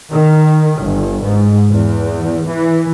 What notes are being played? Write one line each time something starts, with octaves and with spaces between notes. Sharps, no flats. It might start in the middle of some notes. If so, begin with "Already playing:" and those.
D#3
G1
G#2
E2
E3